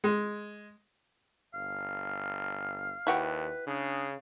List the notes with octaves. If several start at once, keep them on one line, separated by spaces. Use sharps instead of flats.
G#3
G1 F5
D#2 E4 F#4 G4 B4
C#3 D4 G#4